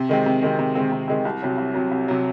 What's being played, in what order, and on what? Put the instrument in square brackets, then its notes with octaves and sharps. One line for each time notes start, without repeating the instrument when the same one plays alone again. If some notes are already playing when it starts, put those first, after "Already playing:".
Already playing: [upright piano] C3
D#3 G#3 C4
C3
D#3 G#3 C4
C3
D#3 G#3 C4
C3
D#3 G#3 C4
C2
C3 F#3
C2
C3 F#3
C2
C3 F#3